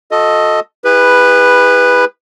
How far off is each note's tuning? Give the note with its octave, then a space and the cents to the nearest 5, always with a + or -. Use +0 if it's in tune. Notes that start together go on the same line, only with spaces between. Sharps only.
F#4 -45 A4 +0 D#5 +5
E4 +0 G#4 -45 B4 +0